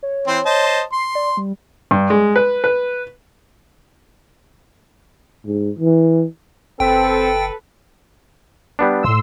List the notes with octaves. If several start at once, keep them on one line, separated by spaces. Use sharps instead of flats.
C#5
E3 C4 C5
C5 D#5 A5
C6 C7
D5
G3
G2
G#3
B4
B4
G#2
E3
F#1 C4 A4 B4 G5
G3 B3 D4
A2 C6 E6